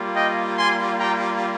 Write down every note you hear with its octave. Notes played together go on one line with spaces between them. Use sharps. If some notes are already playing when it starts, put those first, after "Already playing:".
Already playing: G3 A#3 F4
D#5 G5
G#5 C6
G5 A#5